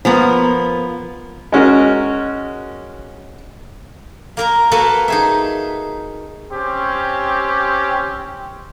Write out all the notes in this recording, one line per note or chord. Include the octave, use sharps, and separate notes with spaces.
F3 A#3 B3
G#3 C#4 F#4 A#4
A#3 A#4 A#5
A#3 F#4 A4 B4 F5 F#5
D#4 G#4 E5
C4 C#4 G4